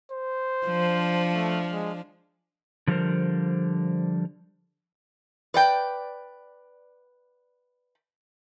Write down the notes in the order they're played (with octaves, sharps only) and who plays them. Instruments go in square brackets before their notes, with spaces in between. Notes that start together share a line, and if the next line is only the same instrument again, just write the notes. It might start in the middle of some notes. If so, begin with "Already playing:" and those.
[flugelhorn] C5
[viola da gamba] F3 D4
[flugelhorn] A3
G#3
[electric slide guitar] D3 F3 G3 G4 A#4 C5
[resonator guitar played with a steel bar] B4 D5 G5